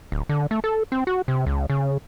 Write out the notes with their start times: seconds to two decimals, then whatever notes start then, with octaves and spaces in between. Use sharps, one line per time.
0.12 D1
0.29 D3
0.51 A3
0.64 A4
0.92 C4
1.07 F#4
1.28 C3
1.47 C#2
1.70 C#3